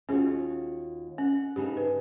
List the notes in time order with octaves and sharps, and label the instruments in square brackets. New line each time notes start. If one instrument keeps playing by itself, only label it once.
[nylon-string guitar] D#2 F4 F#4 [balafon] C#4 G#4
[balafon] C#4 [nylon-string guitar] F#5
[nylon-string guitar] G2 C#3 D#4 [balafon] G4
[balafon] B4